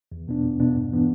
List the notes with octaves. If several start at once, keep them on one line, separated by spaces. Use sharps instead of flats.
E2
B2 B3 D4
E2
B2 B3 D4
G2
E3 B3 D4